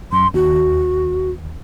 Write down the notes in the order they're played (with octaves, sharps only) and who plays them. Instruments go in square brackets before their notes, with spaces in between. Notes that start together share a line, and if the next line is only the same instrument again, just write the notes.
[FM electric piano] F#2 [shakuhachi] C6
[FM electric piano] D#2 [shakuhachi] F#4